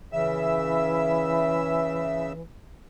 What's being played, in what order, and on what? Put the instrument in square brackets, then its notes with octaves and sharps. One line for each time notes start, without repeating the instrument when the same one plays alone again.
[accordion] C#3 E5 E6 [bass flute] E3